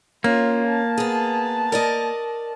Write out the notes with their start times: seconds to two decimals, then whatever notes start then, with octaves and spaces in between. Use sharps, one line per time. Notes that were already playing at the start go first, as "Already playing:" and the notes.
0.24 A#3 C#4 F4
0.67 A5
0.98 B3 G#4
1.72 A#4 D5 D#5